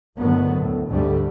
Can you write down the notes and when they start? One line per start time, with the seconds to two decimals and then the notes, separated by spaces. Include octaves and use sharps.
0.16 G1 A2 D3 D#3 F#3 B3
0.58 D2 A2
0.87 D2 G#2 D3 G3 A3